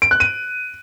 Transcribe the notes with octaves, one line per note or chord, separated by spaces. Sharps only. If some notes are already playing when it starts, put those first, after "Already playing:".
D7
F#6
D#7